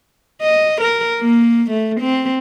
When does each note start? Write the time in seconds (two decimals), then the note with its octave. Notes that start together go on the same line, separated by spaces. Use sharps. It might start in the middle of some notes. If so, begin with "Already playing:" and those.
0.42 D#5
0.81 A#4
1.20 A#3
1.71 A3
2.00 C4